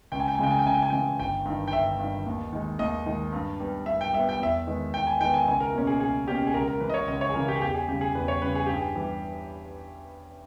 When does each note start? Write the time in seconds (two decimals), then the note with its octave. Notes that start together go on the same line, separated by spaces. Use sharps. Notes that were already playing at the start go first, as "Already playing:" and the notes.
0.12 C#2 G5
0.20 G#5
0.28 G5
0.35 G#5
0.39 C#3 E3 G#3 G5
0.51 G#5
0.59 G5
0.66 C#2 G#5
0.74 G5
0.82 G#5
0.90 C#3 E3 G#3 G5
1.19 G1 G5
1.45 G2 D#3
1.68 G5
1.72 G1 E5
1.99 G2 D#3
2.26 D#2
2.53 D#3 G#3
2.79 D#2 D#5
3.06 D#3 G#3
3.32 G2
3.60 G3 B3
3.86 G2 E5
4.01 G5
4.13 G3 B3 E5
4.29 G5
4.40 E2 E5
4.67 D#3 G#3 B3
4.94 E2 G5
5.07 G#5
5.20 D#3 G#3 B3 G5
5.34 G#5
5.47 C#2 G#5
5.60 A#4
5.74 B2 A#3 C#4
5.87 G#4
6.00 C#2 G#4
6.28 B2 A#3 C#4 G4
6.47 G#4
6.54 C#2 A#4
6.68 A#4
6.80 C#3 E3 B4
6.90 D#5
6.94 C#5
7.08 C#2 D#5
7.21 C#5
7.29 G#4
7.34 C#3 E3 A#4
7.48 G4
7.56 G#4
7.62 E2 G4
7.74 G#4
7.88 C#3 G4
7.91 G3
8.01 G#4
8.15 E2 B4
8.28 C#5
8.42 C#3 G3 B4
8.55 G#4
8.66 G2 G4
8.77 G#4
8.96 E3 G3 B3